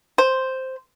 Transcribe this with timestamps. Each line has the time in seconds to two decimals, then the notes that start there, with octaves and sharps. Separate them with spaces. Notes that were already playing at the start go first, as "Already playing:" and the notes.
0.18 C5